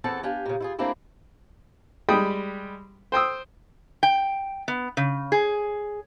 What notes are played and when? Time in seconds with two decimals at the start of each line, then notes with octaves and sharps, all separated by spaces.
0.04 E2 C4 A4 F#5 A5
0.23 D4 G4 F5 G#5
0.46 A#2 C#3
0.60 E4 F4 G#4
0.79 A3 A#3 C4 D4 E4 G4
2.09 G3 G#3 G5 B5 D#6
3.12 C5 G5 D#6 E6
4.03 G5
4.68 B3
4.97 C#3
5.32 G#4